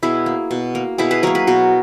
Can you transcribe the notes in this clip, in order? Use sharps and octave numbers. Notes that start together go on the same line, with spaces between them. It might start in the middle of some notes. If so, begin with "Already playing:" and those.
B2 E4 G#4
A#3
B2
A#3
B2 E4 G#4
G#4 B4
F#3 A#3 A#4 C#5
G#4 B4
B2 F#4 A#4